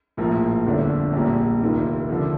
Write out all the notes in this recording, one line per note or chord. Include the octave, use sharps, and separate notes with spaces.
A#1 A2 F3 A#3
G1 F2 D3 A3 D4
A#1 A#2 G3 A#3
F1 D#2 D#3 A#3 F4
D3 F3 A3